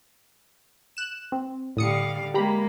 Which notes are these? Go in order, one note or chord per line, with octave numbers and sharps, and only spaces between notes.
F#6 E7
C4
A2 D3 G3 F5 D#6 C#7
G#3 A#3 G4 A#5 B5